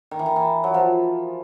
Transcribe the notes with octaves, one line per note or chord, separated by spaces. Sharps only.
D#3
E3
D#3
E3
F#3
F3